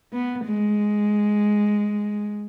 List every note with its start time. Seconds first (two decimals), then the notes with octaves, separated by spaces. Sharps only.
0.13 B3
0.46 G#3